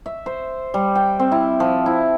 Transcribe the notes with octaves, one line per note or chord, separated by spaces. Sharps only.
E5
C5
G3
G5
C4
E4
F3
E4